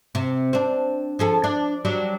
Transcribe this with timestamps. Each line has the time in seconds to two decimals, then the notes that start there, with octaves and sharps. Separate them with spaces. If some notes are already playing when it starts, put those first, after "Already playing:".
0.15 C3
0.53 C4 D4
1.19 F3 G#4 A4
1.44 D4
1.85 F#3 G3 D4